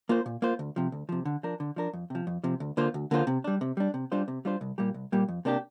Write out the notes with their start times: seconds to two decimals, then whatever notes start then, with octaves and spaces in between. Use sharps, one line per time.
0.09 A#3 F4 C5
0.26 A#2
0.42 A#3 F4 C5
0.59 D2
0.76 C3 F3
0.92 D2
1.09 C3 F3
1.25 D3
1.43 F3 D4 A#4
1.60 D3
1.76 F3 D4 A#4
1.93 F2
2.10 C3 F3
2.27 F2
2.44 C3 F3
2.60 D2
2.77 D3 A#3 F4 C5
2.94 D2
3.11 D3 A#3 F4 C5
3.27 C3
3.44 G3 D4
3.61 C3
3.77 G3 D4
3.94 C3
4.12 G3 D4 F4 C5
4.28 C3
4.45 G3 D4 F4 C5
4.61 C2
4.78 A#2 G3 A#3 G4
4.94 C2
5.12 A#2 G3 A#3 G4
5.28 F2
5.45 C3 A#3 D4 G4